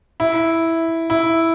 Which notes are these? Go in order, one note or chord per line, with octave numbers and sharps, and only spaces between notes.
E4
E4